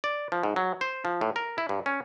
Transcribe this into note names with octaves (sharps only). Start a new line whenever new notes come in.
D5
F3
G#2
F#3
C5
F3
A2
A#4
E4
G2
C#4